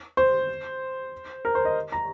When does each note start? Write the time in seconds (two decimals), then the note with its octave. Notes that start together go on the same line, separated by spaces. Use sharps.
0.17 C5
1.45 A#4
1.55 C5
1.65 D#5
1.92 A#5